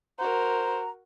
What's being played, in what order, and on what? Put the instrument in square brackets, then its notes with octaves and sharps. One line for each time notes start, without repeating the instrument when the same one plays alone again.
[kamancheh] F#4 A#4 [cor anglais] C5 [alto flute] A#5